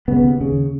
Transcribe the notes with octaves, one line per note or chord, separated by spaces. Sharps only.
C#3 B3
D#2
C#3